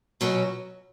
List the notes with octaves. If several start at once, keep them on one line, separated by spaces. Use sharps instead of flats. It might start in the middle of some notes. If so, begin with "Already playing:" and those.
B2 F#3 C#4